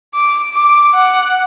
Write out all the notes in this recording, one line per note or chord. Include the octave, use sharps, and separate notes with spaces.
D6
D6
F#5